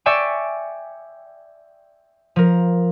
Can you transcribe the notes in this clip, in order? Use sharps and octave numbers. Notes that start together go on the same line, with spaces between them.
D5 E5 G5 G#5 C#6
F3 A#4